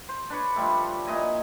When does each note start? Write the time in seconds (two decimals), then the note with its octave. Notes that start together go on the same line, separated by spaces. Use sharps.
0.09 C5
0.30 D4 B4 C#5
0.56 F3 G3 A3
1.07 A#2 E4 D#5 G#5